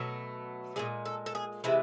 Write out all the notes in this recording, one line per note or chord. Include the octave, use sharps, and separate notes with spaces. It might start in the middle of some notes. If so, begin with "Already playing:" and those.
Already playing: B2 F#3 A3
A#2 F3 G#3 G#4
A4
A4
G#4
C3 E3 G#3 E4